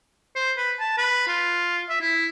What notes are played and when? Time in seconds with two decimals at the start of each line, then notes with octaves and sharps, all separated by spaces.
0.36 C5
0.57 B4
0.80 A5
0.98 B4
1.27 F4
1.89 E5
2.01 E4